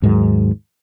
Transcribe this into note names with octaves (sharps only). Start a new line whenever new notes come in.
D#2 G#2 D#3 F#3